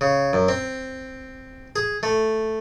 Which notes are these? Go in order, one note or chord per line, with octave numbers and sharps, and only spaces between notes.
C#3
F#2
C4
G#4
A3